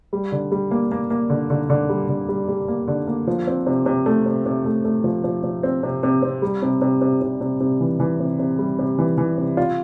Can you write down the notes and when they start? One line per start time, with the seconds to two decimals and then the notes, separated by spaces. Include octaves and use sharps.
0.13 G3
0.32 D3
0.52 G3
0.71 A#3
0.91 A#3
1.10 A#3
1.30 D3
1.50 D3
1.70 D3
1.89 G3
2.09 D3
2.29 G3
2.48 G3
2.68 A#3
2.88 D3
3.07 A#3
3.27 F3
3.47 C4
3.66 C3
3.86 C3
4.06 A3
4.26 C3
4.46 C3
4.65 A3
4.85 A3
5.04 F3
5.24 F3
5.44 F3
5.63 C4
5.83 C3
6.03 C3
6.22 C4
6.42 G3
6.62 C3
6.82 C3
7.01 C3
7.21 C3
7.41 C3
7.60 C3
7.81 E3
8.00 E3
8.20 C3
8.39 C3
8.59 G3
8.79 C3
8.99 E3
9.18 E3
9.38 C3
9.57 F4